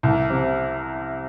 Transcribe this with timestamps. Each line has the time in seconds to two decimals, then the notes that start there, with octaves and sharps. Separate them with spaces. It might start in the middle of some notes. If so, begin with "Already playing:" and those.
0.03 C2
0.30 C3